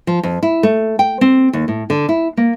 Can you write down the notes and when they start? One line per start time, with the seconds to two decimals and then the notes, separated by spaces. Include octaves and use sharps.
0.07 F3
0.23 F2
0.43 E4
0.63 A3
0.99 G5
1.21 C4
1.53 D#2
1.68 A2
1.90 D3
2.09 E4
2.37 A#3